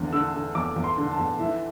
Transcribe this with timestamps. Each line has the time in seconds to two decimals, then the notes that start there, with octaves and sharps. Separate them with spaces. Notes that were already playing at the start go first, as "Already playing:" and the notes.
Already playing: E2 D3
0.13 D3 E6
0.34 D3
0.55 E2 D6
0.76 E2
0.84 C6
0.98 D3
1.11 A5
1.18 E2
1.40 E3 E5